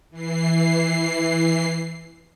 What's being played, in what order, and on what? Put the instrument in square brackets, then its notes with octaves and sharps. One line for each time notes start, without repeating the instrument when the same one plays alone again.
[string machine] E3 C7